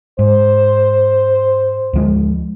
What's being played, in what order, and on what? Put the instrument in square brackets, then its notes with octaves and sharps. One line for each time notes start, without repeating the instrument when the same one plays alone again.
[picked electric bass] G#2 [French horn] C5
[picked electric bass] D2 F3 G#3